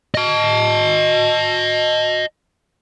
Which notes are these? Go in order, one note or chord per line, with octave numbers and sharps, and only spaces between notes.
D#5 A5